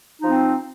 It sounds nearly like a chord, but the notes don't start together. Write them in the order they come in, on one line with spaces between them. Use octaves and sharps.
D#4 F3 C4